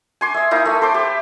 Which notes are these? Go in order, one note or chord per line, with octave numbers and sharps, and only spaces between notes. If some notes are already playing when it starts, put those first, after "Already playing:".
G#5 C6 D6
D#5 E5
A#3 D#4 E4
A3 E5
A4 C5 C6 D6
G4